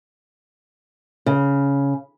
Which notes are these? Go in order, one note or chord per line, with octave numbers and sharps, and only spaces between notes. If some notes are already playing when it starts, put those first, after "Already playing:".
C#3